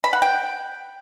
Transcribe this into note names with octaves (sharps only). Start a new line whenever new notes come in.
B5
F#5
G5